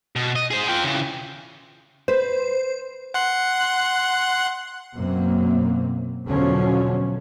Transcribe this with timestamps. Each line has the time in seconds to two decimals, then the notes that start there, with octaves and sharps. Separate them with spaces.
0.16 B2
0.36 D#5
0.51 G#4 C5
0.68 F4 G5
0.84 C#3 E3
2.08 B4 C5
3.14 F#5 C6 F#6
4.96 F#2 B2 A#3 C4
6.25 E2 B2 D3 F3 F#3 C#4